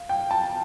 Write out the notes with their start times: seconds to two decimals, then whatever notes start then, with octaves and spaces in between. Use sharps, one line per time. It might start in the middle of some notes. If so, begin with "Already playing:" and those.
Already playing: F5
0.09 G5
0.31 A5